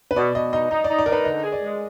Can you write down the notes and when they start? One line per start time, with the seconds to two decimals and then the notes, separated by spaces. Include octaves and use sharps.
0.11 B4
0.16 B2 D5
0.35 B2 D#5
0.53 D#4 D#5
0.71 D#4 D#5
0.84 D#4 D5
0.99 D5
1.06 D#4 A#4
1.12 B4
1.25 D3 D#5
1.43 G#4
1.52 D5
1.62 G#3